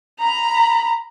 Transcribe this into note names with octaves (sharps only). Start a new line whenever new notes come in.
A#5 B5